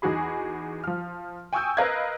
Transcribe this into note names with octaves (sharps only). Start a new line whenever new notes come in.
E2 D#4 F#4 G#4 B5
F3 F6
G5 G#5 C#6 D#6 E6 G6
A#4 B4 D#5 F5 F#6 G#6